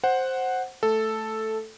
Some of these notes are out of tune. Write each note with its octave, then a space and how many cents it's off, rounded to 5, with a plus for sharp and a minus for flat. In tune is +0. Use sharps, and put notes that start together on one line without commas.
C5 +5 F#5 +0
A3 +0 A4 +0